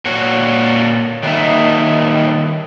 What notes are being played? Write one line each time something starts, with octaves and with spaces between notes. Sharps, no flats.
A#2 F#4 C#5
D#3 F#3 G3 A#3 D#4 E5